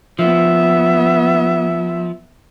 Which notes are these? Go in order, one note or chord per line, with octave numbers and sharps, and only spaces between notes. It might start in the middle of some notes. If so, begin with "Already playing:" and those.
F3 B3 E5